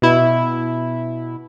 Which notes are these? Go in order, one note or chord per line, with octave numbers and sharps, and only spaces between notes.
B2 E4